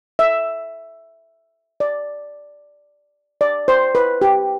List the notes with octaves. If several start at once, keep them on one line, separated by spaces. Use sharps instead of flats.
E5
D5
D5
C5
B4
G4